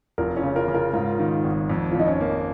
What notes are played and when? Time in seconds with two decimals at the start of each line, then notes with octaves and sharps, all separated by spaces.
0.18 F1 F4 A#4
0.36 C#4 F4
0.43 C#3
0.56 F4 A#4
0.68 C#3
0.74 F4 A#4
0.93 G#2 F4 A#4
1.19 D#3
1.44 G#1
1.70 F2
1.91 F4
1.95 F2 D#4
2.07 C#4
2.20 A#3